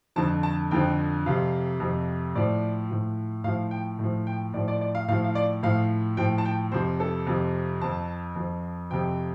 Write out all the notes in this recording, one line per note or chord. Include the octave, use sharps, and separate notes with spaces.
F2 D3 F3 A5
A5
F2 D3 F3 G5
F2 C3 F3 F5
F2 C3 F3
A2 F3 D5
A2 F3
A2 F3 F5
G5
A2 F3
G5
A2 F3 D5
D5
D5
F5
A2 F3 F5
F5
D5
A2 F3 F5
A2 F3 G5
A5
G5
F2 C3 F3 C5
A4
F2 C3 F3
F2 F3 A5
F2 F3
F2 C3 F3 G5